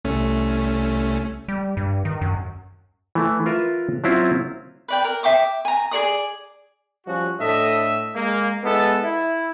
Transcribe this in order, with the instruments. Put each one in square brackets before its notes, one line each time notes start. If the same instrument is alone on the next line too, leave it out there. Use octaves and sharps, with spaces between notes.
[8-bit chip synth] C2 A3 C#4
[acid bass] G3
G2
D#3
F#2
[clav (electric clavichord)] E3 A3
F4 A#4 B4 E5
F#3 C4 C#4 E4 F4
[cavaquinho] B4 D5 G5
A#4
E5 G5 D6 D#6
G#5 A#5
G#4 A4 D5 D#6
[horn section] F3 G3 C#4 F#4
A2 D4 A4 D#5 E5
G#3 A#3
G#3 B3 E4 A4
E4